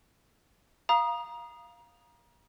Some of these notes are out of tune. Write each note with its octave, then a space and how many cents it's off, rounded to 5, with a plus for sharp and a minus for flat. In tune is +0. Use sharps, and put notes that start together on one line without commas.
F5 +0 A#5 +30 D#6 -10